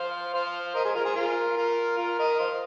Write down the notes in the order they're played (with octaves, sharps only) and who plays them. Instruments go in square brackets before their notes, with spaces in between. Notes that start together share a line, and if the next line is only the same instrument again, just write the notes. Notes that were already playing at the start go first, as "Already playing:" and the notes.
Already playing: [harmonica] C5 F5
C5 F5
A#4 D#5
G#4 C5
F4 A#4
G#4 C5
F4 A#4
F4 A#4
F4 A#4
A#4 D#5
C5 F5